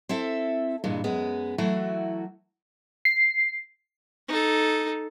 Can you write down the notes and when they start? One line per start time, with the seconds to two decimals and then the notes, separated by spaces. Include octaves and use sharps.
0.09 C4 E4 A4 E5
0.84 G2 A#2 E3 G#3
1.04 F#2 G#3 B3
1.58 E3 F#3 A3 E4 F#4
3.05 C7
4.28 D#4 A4